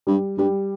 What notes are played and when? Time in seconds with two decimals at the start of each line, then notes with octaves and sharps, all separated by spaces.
0.07 G2 G3
0.38 G2 G3